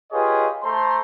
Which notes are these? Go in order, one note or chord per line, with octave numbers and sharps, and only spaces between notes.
F4 G4 G#4 B4 C#5 D#5
A3 C5 A5 A#5 C6